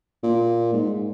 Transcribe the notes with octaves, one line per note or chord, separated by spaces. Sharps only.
A#2
G#2